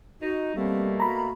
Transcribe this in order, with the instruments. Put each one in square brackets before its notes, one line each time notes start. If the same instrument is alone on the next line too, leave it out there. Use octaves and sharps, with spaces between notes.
[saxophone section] D#4 [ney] F#4
[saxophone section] B2 A3 A#3 [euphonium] G3 [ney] C4
[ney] F#4 [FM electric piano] A#5 B5